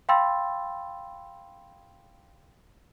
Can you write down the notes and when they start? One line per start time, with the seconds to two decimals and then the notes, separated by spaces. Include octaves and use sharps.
0.09 F5 G5 B5 C6 E6 A6